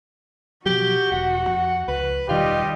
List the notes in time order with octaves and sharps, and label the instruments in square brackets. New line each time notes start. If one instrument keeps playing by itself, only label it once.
[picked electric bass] B2 F3 F#3 [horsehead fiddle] F#4 [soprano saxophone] G4
[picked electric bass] E1 [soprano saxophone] F#5
[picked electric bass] F2
[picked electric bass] C#2 [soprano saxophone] B4
[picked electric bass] E1 D#3 [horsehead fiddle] G3 D#5 [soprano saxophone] F4 [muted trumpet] G4